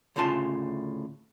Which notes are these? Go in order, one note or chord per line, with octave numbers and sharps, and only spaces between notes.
D2 A2 C#3 F4 A5